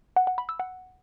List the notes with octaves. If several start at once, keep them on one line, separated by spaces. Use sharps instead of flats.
F#5
F#5
B5
E6
F#5